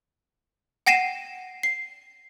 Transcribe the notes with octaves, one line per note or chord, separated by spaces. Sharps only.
F#5 G5 A#6 C7 D#7 E7
C7